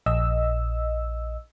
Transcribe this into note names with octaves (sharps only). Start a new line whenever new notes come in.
A#1 D#5 E6